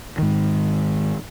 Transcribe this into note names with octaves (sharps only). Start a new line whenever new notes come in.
G#2 D#3